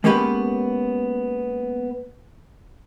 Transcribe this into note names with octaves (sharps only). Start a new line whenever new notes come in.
G#3 A#3 B3 C#4 G4 B4